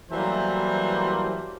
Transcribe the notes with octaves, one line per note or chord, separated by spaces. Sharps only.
E3 F#3 G3 A3 A#3 C5